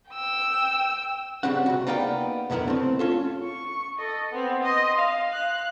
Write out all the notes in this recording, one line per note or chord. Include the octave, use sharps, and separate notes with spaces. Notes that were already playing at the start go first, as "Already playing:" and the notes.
G5 E6
C#3 F3 G3 C4 C#4 F#5
C3 F#4
A#3 B3 D#4 D5 F5 G5
B1 F2 D3 B3 E4 A#4
A3 C4
C#4 F4 A4
C#6
A4 D#5
B3 C4
D#5 C6
F5
F5 F#6